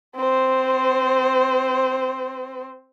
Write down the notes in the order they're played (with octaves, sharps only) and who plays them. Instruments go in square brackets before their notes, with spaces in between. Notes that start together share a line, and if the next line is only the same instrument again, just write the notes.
[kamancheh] C4 C5